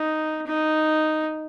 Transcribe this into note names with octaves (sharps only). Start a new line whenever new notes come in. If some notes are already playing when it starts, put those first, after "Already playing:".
Already playing: D#4
D#4